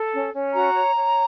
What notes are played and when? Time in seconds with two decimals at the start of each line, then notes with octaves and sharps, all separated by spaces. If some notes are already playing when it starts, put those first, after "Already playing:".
Already playing: A4
0.13 C#4
0.34 C#4
0.54 F#4 A#5
0.74 C#5
0.95 C#5